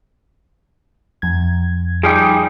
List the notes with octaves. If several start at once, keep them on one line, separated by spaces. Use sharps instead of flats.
F2 G#6
F3 G3 D#4 G#4 G5